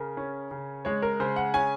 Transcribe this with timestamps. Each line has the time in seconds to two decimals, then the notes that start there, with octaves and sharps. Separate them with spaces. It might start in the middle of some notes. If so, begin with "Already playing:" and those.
Already playing: C#3 A#4
0.17 C#4
0.51 C#3
0.85 G#3 C#5
1.02 A#4
1.20 C#3 C5
1.36 F#5
1.54 C#4 G#5